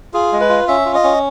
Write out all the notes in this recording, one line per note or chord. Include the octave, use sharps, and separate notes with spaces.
F4 G#4
G#3
B4
F4
C#4 E5
F4
D#5
C#4